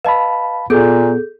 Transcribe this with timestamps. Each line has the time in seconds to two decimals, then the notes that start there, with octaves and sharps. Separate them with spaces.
0.05 B4 D#5 F5 A5 B5
0.70 A#2 B3 G#4 A4 G6